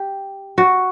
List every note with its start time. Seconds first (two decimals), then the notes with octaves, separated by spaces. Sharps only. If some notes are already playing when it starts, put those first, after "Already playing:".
Already playing: G4
0.58 F#4